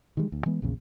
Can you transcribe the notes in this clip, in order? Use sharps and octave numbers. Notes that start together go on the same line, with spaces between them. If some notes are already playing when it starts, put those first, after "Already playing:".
D#3 E3 G3 G#3
D2
E3 G#3 B3
A#1 E2 A#2 C#3